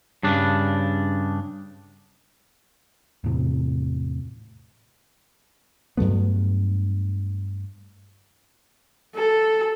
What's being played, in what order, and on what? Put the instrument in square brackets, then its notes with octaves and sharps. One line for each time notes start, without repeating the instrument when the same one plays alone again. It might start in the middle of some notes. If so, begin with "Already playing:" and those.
[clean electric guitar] G2 C#3 D4
[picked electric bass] E2 A2 C3
[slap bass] G2 F#3 A3 B3
[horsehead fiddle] A4